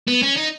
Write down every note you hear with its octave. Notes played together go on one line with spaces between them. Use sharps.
B3
C#4
D#4